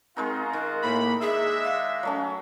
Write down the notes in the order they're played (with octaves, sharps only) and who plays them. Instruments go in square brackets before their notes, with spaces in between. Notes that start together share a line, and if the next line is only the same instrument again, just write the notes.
[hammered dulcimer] G#3 D#4 A#4 [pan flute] C4 [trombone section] F4 F#4
[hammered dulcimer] D#3 [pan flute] A#4
[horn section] A2 B5 [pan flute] A#3
[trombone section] G#3 D4 D#4 [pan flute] G#4 [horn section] E5
[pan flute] F5
[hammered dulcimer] F#3 A3 C#4